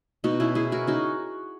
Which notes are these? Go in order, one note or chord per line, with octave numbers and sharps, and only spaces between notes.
B2 D#4 F#4
B2 C#4 E4
B2 E4 G#4
B2 F#4 A#4
C#4 D#4 F#4